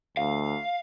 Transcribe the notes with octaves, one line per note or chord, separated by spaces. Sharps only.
D2 F5